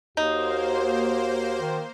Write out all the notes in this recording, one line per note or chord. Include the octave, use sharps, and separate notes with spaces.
D#2 A#3 D#4 F#4 C5
D#3